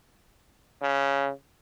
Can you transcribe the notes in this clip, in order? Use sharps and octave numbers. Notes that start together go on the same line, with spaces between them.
C#3